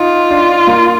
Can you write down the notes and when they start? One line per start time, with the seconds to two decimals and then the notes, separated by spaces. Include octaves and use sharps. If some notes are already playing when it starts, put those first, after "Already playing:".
Already playing: D#4 F4
0.30 D4
0.67 A#3